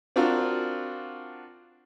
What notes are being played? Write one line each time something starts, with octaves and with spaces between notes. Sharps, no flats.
C4 D4 F4 F#4 A#4